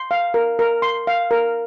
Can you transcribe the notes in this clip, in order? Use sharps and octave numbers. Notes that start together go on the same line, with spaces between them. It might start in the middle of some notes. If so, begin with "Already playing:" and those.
Already playing: C6
F5
A#4
A#4
C6
F5
A#4